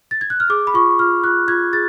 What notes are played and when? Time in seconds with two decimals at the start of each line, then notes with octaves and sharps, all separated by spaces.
0.11 A6
0.21 G#6
0.30 F#6
0.40 F6
0.50 G#4 D6
0.67 B5
0.74 F4 C#6
0.99 F4 F6
1.24 F4 F#6
1.48 F4 G#6
1.73 G#4 A6